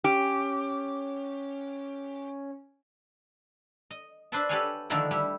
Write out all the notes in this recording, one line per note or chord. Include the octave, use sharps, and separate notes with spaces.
C#4 G4
D#5
D4 B4 C5 D5 E5 A5
G4 A4 B4 C#5 F5 G#5
D3 D#3 F3 A3 D4 E4
G3 E4 G4